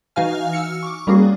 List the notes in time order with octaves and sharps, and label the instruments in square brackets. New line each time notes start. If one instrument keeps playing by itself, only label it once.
[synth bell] E3 D#4 F#4 F5 G#5 F6
E6 F6 C#7
C#6 D6
G3 A#3 C#4 F#4 G#4